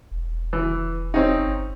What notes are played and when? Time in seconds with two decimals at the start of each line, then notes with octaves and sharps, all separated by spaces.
0.11 E1
0.53 E3
1.14 C4 C#4 D#4
1.38 G1